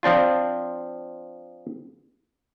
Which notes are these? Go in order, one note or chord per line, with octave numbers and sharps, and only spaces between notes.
F3 C4 D4 F4